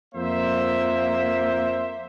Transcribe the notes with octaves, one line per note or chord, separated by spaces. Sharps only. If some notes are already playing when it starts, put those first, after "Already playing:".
F2 A#3 C5 E5